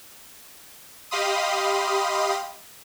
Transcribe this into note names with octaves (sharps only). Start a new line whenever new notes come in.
G4 D#5 F5 B5 C6 D#6